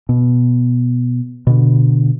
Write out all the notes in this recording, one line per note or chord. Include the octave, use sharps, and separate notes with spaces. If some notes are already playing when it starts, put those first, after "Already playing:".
B2
B2 D3